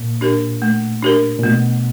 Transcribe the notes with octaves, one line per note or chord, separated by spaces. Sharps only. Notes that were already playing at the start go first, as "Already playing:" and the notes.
Already playing: A#2
D4 G4 A#4
A3
D4 G4 A#4
A#2
B2 A3